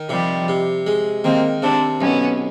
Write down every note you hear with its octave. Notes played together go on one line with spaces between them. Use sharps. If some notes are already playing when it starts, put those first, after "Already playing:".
Already playing: D#3
C3 F3 G3
C3
G#3
D#3 A#3 C4
C3 C4 D4
B1 B3 C#4